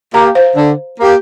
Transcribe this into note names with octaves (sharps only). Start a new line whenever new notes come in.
A#3 G4 F5 A#5
C5 F5
D3
A#3 G4